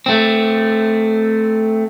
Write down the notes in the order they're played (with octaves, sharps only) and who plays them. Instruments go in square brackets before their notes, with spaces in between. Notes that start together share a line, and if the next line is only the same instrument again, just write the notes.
[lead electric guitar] A3 C4